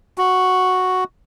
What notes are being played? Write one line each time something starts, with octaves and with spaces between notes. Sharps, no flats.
F#4